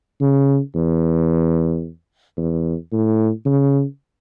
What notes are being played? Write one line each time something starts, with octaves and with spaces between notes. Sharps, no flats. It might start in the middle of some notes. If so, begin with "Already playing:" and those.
C#3
E2
E2
A2
C#3